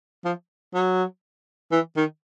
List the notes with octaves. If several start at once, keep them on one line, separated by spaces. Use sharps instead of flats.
F3
F#3
E3
D#3